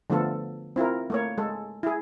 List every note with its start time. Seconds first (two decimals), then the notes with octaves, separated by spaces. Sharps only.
0.10 D3 F3 A3 B3 F4 A4
0.76 C4 E4 F4 A#4
1.10 A3 A#3 C#5
1.38 G#3 A4
1.83 E4 G#4